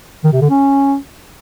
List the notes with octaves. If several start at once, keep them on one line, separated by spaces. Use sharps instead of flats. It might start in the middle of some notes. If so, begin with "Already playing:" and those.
D#3
C3
D3
C#4